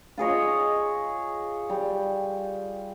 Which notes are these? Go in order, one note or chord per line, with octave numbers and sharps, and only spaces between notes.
F4 G#4 C#5 D#5
G3